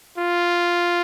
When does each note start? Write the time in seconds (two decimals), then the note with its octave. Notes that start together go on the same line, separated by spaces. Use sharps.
0.18 F4